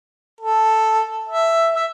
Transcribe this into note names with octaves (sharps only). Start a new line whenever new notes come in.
A4
E5
E5